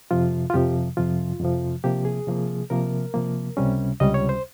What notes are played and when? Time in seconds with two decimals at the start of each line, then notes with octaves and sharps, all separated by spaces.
0.11 F2 C3 F3 F4
0.50 F4
0.54 F2 C3 F3 G4
0.97 F2 C3 F3 F4
1.40 F2 C3 F3
1.84 C3 F3 A#3 G4
2.05 G#4
2.27 C3 F3 A#3
2.70 C3 F3 A#3 A#4
3.14 C3 F3 A#3
3.57 C#2 C3 G3 C#4
4.00 C#2 C3 G3 C#4 D#5
4.14 C#5
4.29 C5